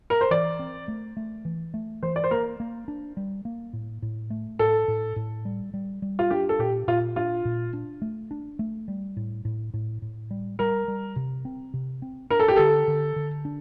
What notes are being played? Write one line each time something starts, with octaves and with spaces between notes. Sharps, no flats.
A#4
C5
E3 D5
C4
A3
A3
E3
A3
E3 C5
D5
C5
A#3 A#4
A#3
D4
G3
A#3
A2
A2
A3
A2 A4
A2
A2
G3
G3
G3
F4
D4 G4
A4
A#2 G4
A#2 F4
D4 F4
A#2
D4
A3
D4
A3
G3
A2
A2
A2
A2
G3
G3 A#4
G3
C3
C4
C3
C4
D4 A#4
A4
G4
D3 A4
D3
D3
D4